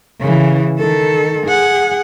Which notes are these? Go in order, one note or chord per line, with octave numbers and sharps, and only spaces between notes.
C#3 E3
D#3 A4
G#4 F#5